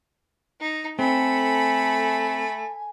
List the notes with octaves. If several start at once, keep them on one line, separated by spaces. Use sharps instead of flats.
D#4
A3 C4 A4 G#5 B5